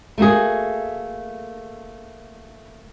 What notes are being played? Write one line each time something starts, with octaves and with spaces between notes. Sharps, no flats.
A3 A#3 F#4 G#4